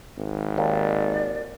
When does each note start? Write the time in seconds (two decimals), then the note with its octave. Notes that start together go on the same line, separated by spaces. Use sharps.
0.18 G#1
0.58 D#2 D5